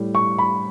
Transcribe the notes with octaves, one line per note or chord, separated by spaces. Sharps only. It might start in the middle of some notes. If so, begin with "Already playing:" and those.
Already playing: A2 G3
C#6
B5